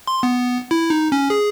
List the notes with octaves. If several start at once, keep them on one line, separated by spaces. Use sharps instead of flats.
C6
B3
E4
D#4
C#4
G#4